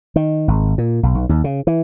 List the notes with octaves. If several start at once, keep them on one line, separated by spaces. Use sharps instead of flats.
D#3
G#1
A#2
B1
B1
D#2
C#3
E3